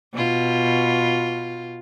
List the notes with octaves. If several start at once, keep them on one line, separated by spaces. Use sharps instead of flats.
B2 F4